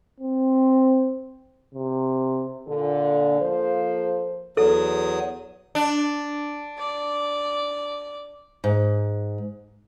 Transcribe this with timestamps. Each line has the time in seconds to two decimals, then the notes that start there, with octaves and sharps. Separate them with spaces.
0.21 C4
1.75 C3
2.67 A#2 D3 A4
3.40 F3 A#3 A4 C5
4.57 E2 F#3 A4 D#6
5.75 D4
6.78 D5
8.64 G#2